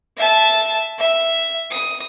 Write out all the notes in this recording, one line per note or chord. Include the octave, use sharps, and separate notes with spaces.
E5 A5
E5
D#6